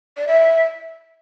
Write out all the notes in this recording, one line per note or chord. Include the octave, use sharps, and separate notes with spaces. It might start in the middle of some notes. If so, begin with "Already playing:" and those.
D5
E5